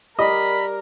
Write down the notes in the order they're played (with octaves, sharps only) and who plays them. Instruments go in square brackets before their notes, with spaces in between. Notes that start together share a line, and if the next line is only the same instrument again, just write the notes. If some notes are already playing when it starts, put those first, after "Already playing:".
[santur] G3 [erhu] A#4 [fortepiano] D#5 [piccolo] B5